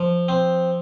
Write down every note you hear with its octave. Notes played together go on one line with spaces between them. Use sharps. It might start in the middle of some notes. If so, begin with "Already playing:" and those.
Already playing: F3
C4